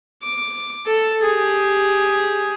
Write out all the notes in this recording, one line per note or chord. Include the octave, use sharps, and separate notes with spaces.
D6
A4
G4 G#4